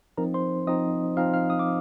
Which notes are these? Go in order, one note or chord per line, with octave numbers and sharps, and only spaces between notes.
F3 C4 D#4 A#4 A#5
C5 C6
F3 C4 D#4 D#5 D#6
F3 C4 D#4 F5 F6
F5 F6
D#6
D6